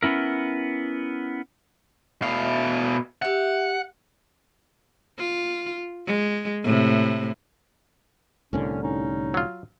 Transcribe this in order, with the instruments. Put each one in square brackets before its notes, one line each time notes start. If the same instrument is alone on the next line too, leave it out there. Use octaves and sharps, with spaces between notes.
[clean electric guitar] B3 C#4 E4 A#4
[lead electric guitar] B2 F5 [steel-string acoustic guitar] A3 D#4 E4
[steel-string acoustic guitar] G4 E5 [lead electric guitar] F#5
[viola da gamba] F4
G#3
A2 C3
[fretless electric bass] C2 A2 D3 [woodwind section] C#4
[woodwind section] C#4 D#4
[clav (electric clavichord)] F#3 F4